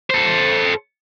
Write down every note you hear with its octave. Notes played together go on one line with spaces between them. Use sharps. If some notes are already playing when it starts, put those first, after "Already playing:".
A4 C5